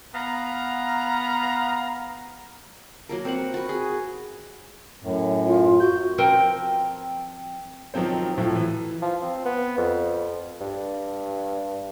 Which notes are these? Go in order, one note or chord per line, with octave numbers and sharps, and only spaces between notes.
B3 F5 A#5
F#3 A#3 A#4
C4 A#4 B4 F#5
F#4 B4
G#4
F#2 A2
F4
F#4 G6
F3 C4 A#4 G5
D#3 F3 F#3 C4 C5
A2 F3 F#3 E4
E3
F3
C4
B3
F2
G2